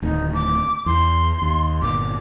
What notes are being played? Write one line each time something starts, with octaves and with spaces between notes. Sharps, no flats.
D1 D2 D#3 D#4
D6
E2 C6
D#2
G1 A#2 D6